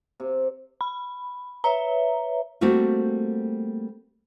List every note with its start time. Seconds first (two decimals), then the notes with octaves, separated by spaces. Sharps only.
0.20 C3
0.81 B5
1.64 B4 C#5 E5 A#5
2.61 G3 A3 A#3 C4 F#4